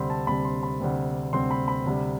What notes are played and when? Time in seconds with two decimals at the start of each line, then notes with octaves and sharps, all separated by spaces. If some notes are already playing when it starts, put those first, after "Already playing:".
Already playing: D2 C3 G3 C4 B5 C6
0.10 A5
0.27 D2 C3 G3 C4 B5
0.45 C6
0.63 B5
0.80 D2 C3 G3 C4
1.33 D2 C3 G3 C4 C6
1.51 B5
1.68 B5
1.86 D2 C3 G3